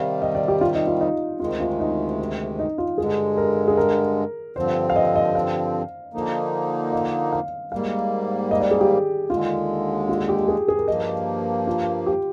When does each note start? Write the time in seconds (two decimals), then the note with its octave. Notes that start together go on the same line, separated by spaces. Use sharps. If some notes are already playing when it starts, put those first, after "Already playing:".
Already playing: C3 D#3 G3 F5
0.22 D#5
0.35 D5
0.48 G4
0.61 F4
0.74 D#4
0.87 F4
1.00 D#4
1.40 D2 C3 D#3 G#3 F4
1.60 F4
1.79 D#4
2.59 D#4
2.78 F4
2.98 G2 D3 G#3 G#4
3.37 A#4
3.68 G#4
3.77 A#4
4.56 G2 D3 F3 C4 C5
4.90 F5
4.96 D#5
5.16 D#5
5.35 F5
6.14 D3 F3 A#3 D#4
6.93 D#5
7.32 F5
7.72 G#2 G3 A#3 F5
8.51 D#5
8.61 D5
8.71 G#4
8.81 G4
9.30 D#2 D3 G#3 F4
10.09 F4
10.29 G4
10.48 G#4
10.68 G#4
10.78 A#4
10.88 G2 F3 A#3 D#5
11.67 F4
12.06 G4